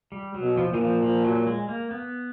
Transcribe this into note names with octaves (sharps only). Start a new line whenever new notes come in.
G3
F#3
B2
F3
A#2 E3
F3
F3
F#3
G#3
A#3
B3